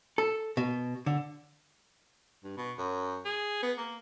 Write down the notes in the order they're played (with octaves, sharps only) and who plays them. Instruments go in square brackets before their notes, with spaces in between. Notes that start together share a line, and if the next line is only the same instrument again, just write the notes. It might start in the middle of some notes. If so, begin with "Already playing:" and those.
[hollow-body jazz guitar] A4
B2
D3
[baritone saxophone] G2
B2
F#2
G#4
B3
A#3